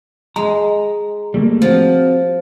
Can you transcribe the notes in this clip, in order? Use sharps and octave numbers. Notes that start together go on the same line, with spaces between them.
G#3 A#5
G3 A3 A#3
F3 C4 F#4